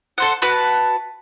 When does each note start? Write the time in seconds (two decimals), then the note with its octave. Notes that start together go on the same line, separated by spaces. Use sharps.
0.18 A4 C5 F#5
0.42 F#4 B4 F#5 A5